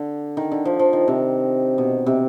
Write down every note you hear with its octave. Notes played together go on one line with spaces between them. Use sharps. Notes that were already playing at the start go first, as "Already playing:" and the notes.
Already playing: D3
D#3
D3
F3
F3
D#3
C3
B2
C3